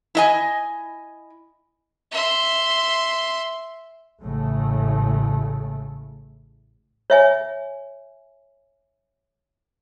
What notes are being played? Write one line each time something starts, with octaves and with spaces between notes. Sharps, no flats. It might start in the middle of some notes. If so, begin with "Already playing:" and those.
E4 D#5 G#5
E5 C6
A1 A2 C#3 A3
C#5 E5 G#5